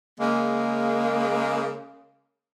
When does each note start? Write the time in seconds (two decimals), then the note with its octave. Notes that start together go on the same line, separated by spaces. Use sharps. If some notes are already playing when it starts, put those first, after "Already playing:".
0.20 C#3 G#3 A#3